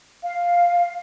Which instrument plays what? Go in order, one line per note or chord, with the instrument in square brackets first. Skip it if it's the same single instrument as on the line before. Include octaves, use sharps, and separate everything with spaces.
[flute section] F5